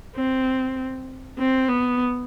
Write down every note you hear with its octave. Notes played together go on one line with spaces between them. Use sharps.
C4
C4
B3